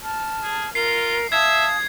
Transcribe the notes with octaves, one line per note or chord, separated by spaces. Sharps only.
A5 F6
G#4
F4 A#4 C7
E5 F5 A5 D#6 G#6